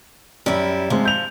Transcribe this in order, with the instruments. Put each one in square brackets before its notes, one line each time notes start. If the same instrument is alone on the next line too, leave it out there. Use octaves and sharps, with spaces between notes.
[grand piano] F#2 [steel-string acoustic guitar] G3 E4
[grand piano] C3 G#3 [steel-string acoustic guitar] F3
[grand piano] G6 F7